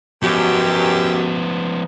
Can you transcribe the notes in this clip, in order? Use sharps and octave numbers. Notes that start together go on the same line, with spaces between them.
F#2 B2 F3 B3 G4